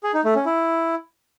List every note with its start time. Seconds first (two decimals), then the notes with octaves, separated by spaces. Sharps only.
0.04 G#4
0.14 D#4
0.25 A3
0.35 C#4
0.46 E4